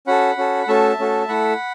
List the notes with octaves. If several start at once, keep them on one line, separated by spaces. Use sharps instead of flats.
C#4 F#4 A4 F#5 B5
C#4 F#4 A4
F#5
A3 C#4 F#4 A4 E5 A5
A3 C#4 F#4 A4
A3 E4 A4 F#5 B5